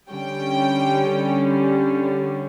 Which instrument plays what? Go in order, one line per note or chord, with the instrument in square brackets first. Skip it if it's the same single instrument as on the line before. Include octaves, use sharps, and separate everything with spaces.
[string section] D3 G3 C#4 G5